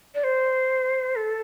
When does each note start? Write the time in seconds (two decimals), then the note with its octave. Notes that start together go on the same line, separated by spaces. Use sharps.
0.15 D5
0.24 C5
1.16 A4